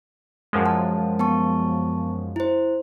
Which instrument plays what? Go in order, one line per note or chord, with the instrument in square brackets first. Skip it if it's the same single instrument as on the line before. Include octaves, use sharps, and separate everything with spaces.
[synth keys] F#2 F3 G#3
[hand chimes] A5
B3 A5 C#6
E4 C5